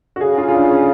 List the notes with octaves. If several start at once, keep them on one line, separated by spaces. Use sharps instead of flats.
F#4
C#3 G#4
F4
F4
D4
C#4